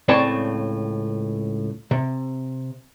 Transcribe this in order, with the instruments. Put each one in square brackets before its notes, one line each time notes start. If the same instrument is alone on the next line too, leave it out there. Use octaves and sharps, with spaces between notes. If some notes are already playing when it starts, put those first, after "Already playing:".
[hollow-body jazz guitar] C#2 A2 C4 C#5 D5 A5
C3